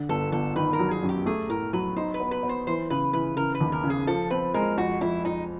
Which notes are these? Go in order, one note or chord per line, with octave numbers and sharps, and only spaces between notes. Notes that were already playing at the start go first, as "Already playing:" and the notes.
Already playing: D3
G1 A4
G1 A4
D#3 B4
A#4
F#3
G#4
F#2
G4
A3 G#4
A2 A#4
F#3 B4
D#4 C5
B4
B3
B4
B3
C5
E3 C5
C#3 B4
E3 B4
C#3 A#4
B4
D#2
A#4
C#3
G#4
F3 A4
C4 B4
G#3 A#4
F2 F#4
F2 E4
F2 D#4